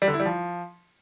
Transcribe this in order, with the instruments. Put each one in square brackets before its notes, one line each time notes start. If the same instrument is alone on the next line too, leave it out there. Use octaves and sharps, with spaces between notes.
[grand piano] G3
D3
E4
G3
F3